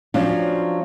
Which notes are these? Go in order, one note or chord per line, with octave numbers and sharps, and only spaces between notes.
F3 F#3 C#4 D4